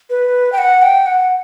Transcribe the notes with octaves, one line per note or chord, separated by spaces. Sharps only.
B4
G5
F#5
G5
F#5